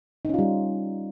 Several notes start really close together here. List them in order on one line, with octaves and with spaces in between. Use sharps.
D#4 C#4 F4 G3